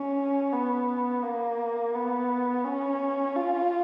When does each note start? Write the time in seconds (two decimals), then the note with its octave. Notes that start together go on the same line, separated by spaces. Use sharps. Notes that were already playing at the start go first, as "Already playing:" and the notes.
Already playing: C#4
0.52 B3
1.23 A#3
1.95 B3
2.65 C#4
3.36 F4